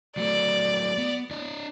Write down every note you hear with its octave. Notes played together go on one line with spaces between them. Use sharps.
F#3 A3 D5
B3
D4 D5 D#5